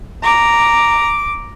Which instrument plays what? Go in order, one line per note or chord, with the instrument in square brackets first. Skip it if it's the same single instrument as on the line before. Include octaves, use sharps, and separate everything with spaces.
[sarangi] A#5 [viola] D6